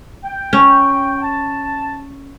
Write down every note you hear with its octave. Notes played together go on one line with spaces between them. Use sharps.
G5
C#4
A5